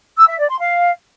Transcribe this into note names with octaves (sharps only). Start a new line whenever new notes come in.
E6
E5
D5
C6
F5